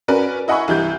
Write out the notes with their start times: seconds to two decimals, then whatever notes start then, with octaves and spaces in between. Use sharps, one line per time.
0.08 C#4 F#4 A#4 B4 D5
0.48 E4 D#5 F#5 G#5 B5 C#6
0.68 C2 E3 G4 G6